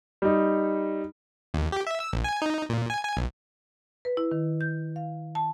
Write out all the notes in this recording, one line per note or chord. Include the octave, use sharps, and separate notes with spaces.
G3 D#4
D#2
G4
E5
E6
A#1
G#5
D#4
A#2
G#5
G#5
B1
B4
E4
D#3
G6
F5
A5